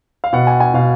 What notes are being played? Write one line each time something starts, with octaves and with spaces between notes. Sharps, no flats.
F5
B2 F#5
G#5
G#5
B2 F5